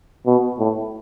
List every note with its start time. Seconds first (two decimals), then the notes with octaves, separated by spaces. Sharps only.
0.26 B2
0.59 A2